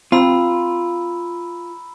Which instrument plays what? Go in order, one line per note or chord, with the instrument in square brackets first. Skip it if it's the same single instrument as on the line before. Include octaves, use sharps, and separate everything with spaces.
[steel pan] C4 [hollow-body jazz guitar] F4 [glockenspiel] A#5 B5 E6